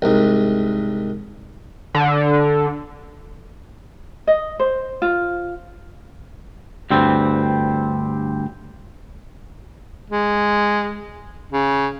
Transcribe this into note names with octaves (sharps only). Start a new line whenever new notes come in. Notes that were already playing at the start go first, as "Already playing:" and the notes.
C2 G#2
D3
D#5
C5
F4
D2 G2 G3 C4
G#3
C#3